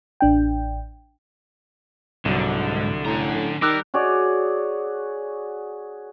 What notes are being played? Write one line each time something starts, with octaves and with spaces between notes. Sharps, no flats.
A1 D4 G5
C2 G#2 D3 F#3
A2 C#4 A#5
D#3 G3 A#4 D6 E6 F#6
F#4 G#4 C#5 D5